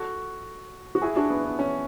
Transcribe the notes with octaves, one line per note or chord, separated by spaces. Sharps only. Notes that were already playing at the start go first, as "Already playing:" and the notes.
Already playing: F#4 A4
F#4
E4 G#4
D4 F#4
B3 D4
B3
C#4